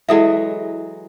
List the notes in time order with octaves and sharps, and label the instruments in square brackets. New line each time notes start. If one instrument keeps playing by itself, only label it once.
[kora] E3 F#3 G#3 [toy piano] E4 A4 E5